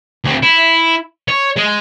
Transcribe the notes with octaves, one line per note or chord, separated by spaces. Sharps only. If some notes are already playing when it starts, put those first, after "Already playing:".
D2 C4
E4
C#5
G#3